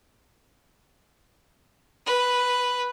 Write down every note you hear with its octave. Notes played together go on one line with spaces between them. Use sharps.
B4